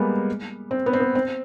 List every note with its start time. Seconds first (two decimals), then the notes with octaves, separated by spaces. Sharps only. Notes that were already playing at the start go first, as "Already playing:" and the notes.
Already playing: G3 G#3 A#3 B3
0.71 C4
0.86 B3
0.93 C4
1.00 B3
1.15 C4